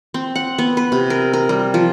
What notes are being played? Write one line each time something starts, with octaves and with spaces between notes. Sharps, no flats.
C4
F#5
B3
B4
C3
A#4
A#4
G3
F3